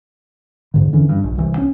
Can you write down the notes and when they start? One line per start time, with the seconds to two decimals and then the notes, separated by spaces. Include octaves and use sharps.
0.74 E2 G#2 D3
0.93 D3 E3 C#4
1.09 G2
1.24 A#1
1.38 C2 E3
1.58 C#4